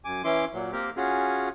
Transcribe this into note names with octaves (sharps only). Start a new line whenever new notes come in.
F#2 G#5 D6
E3 C#4 E4 C6 D6
A#2 F#3
A#3 C4 G4 A#4
C#4 F4 F#4 G#4